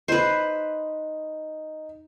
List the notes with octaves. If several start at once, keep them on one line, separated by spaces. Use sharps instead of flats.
D#4 B4 C5